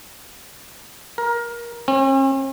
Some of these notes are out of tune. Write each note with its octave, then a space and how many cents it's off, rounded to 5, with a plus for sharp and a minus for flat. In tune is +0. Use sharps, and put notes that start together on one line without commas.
A#4 +20
C#4 -45